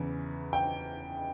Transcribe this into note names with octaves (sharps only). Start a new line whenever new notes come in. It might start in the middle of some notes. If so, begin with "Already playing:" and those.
Already playing: E2 C#3 E3
G5